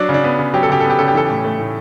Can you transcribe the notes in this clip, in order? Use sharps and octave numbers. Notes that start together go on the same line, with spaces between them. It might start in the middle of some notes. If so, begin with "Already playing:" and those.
Already playing: F#3 D4
C#3
D4
B3
C#3
F#3 G4
A4
C#3 G4
B3 A4
G4
C#3 A4
G4
E3 A4
A2 G4
A3
A2